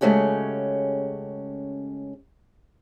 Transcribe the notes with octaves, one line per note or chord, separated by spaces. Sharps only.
C#3 G#3 A3 C#4 F#4 G4